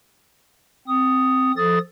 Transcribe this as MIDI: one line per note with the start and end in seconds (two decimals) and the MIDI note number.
0.87 1.52 60
0.87 1.52 87
1.57 1.78 53
1.57 1.78 69
1.57 1.78 87
1.57 1.78 93